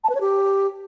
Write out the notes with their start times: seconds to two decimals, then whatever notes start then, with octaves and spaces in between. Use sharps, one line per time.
0.04 A5
0.10 B4
0.15 C#5
0.21 G4